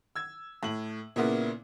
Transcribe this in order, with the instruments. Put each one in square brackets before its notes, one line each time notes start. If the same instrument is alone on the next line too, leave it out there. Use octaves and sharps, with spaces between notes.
[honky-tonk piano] E6 G#6
A2 F#7
A#2 C#3 A#3 B3 E4